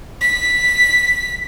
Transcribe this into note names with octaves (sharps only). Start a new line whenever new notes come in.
B6